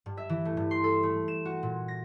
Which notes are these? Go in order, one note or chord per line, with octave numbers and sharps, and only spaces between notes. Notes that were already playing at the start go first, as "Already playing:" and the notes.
G2
E5
E3
A3
G2
C6
A4
A3
E7
F#4
A#2
A#6